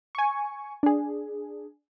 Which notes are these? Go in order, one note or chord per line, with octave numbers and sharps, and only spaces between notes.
G#5 C#6
D4 G#4